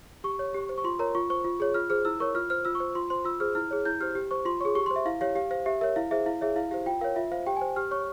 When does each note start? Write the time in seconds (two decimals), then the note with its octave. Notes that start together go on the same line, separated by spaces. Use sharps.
0.24 G4 C#6
0.39 C#5
0.54 G4
0.69 C5
0.78 C#6
0.84 F4 C6
0.99 A#4 C#5 A#5
1.15 F4 C#6
1.30 C5 C#6
1.44 F4
1.60 G#4 C#5
1.74 F4 F6
1.90 G#4 C5 F6
2.05 E4 E6
2.20 A#4 C#5 C#6
2.35 F4 F6
2.50 C5 F6
2.65 F4 E6
2.75 C#6
2.80 C5
2.95 F4 C6
3.10 C5 C6
3.25 F4 E6
3.40 G#4 C5 F6
3.55 E4 F6
3.71 G#4 C#5
3.85 E4 G6
4.00 G4 C5 F6
4.15 G4
4.31 C5 C#6
4.45 F4 C6
4.61 G#4 C#5 C#6
4.75 G4 C#6
4.86 C5 C6
4.96 E5
5.06 E4 F5
5.21 G4 C#5 F5
5.35 G4 F5
5.51 C5 F5
5.66 G4 E5
5.81 A#4 C#5 E5
5.96 E4 F5
6.11 G#4 C5 E5
6.26 E4 F5
6.41 G#4 C#5 E5
6.56 E4 F5
6.71 G4 C5 F5
6.86 F4 G5
7.01 A#4 C#5 F5
7.16 F4 E5
7.32 C5 F5
7.46 G4 G5
7.57 C5 G#5
7.76 G4 F6
7.91 C#5 C#6